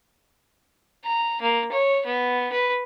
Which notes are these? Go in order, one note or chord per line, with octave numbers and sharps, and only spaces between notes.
A#5
A#3
C#5
B3
B4